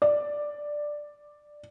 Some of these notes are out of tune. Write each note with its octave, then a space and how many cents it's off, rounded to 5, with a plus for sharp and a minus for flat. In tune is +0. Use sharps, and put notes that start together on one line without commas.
D5 +5